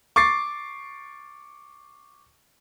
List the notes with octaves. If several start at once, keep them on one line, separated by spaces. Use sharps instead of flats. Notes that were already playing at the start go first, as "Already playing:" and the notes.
C#6 D6 A6 C7